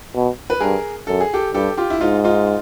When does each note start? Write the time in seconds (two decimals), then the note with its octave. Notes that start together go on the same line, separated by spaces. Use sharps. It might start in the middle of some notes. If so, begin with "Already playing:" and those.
0.14 B2
0.50 B4
0.60 G2 G#4 A#4
1.07 F#2 A4
1.20 G#4
1.33 G4 A4
1.54 G2 G4 A4
1.77 F4 G4
1.90 E4
2.01 G#2 D#4 F4
2.24 D#4 F4